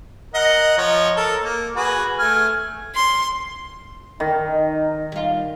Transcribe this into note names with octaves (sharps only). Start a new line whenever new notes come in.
A#4 D#5 F#5
F3 C#5 D#5
A4 A#4 A5
A#3
F#4 G#4 B4
A3 G#5 F6
C6
D#3 D#4
G3 F4